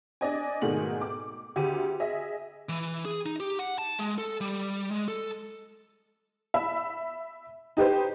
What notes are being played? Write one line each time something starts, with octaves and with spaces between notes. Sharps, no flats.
D4 D5 D#5 G#5
G#2 B2 D#3 A3 G#4 F#7
D6
D2 G4 G#4 D#7
G#4 D#5 E5
E3
G#4
D#4
G4
F#5
A5
G#3
A4
G3
G#3
A4
E5 B5 E6
D#4 G4 B4 C5